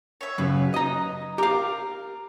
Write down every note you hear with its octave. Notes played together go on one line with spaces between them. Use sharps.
C#5 E5
F#2 C#3 F#3 B4
D#5 A#5
G4 A#4 F5